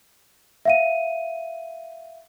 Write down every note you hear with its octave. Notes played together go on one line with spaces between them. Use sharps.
E5 F5 D#7